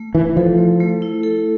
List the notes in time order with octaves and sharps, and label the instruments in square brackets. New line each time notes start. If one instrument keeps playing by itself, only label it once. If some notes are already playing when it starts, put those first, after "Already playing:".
Already playing: [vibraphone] A3
[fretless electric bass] E3 [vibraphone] E4
[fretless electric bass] F3 [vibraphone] A4
[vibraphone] A3
A3
E4
A4